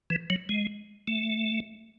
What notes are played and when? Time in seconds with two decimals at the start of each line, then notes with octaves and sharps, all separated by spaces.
0.10 E3
0.30 F#3
0.49 G#3
1.08 A3